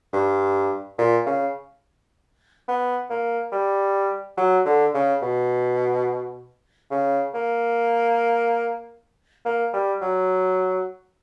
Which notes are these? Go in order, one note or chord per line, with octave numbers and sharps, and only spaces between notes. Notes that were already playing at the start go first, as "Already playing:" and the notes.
G2
A#2
C#3
B3
A#3
G3
F#3
D3
C#3
B2
C#3
A#3
A#3
G3
F#3